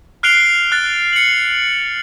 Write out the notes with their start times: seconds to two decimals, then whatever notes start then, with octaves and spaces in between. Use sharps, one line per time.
0.23 F6 F#6 C7 D7 F7 G7
0.72 F#6 A6
1.13 C#7 F#7